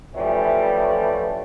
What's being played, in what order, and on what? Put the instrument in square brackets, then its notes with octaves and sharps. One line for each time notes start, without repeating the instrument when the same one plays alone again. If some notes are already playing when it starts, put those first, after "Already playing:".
[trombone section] E3 F3 G3 A3 C#4